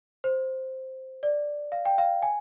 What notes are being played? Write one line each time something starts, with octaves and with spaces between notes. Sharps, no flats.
C5
D5
F5
G5
F5
G#5